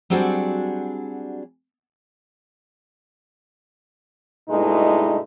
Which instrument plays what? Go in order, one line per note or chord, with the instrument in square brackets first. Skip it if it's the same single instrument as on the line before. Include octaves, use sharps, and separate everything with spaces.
[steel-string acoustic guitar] F#3 G3 C4 D4 F#4 G#4
[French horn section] G2 B2 G#3 A3 D#4 E4